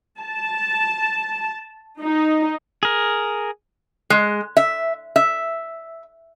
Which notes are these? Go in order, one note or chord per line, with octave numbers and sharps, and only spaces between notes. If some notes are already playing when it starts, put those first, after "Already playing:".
A5
D#4
G#4 A#4
G#3
E5
E5